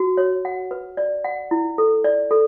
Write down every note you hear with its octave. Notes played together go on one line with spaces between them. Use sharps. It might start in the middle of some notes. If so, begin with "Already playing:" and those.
Already playing: F#4
C#5
F#5
B4
D5
F#5
E4
A4
D5
A4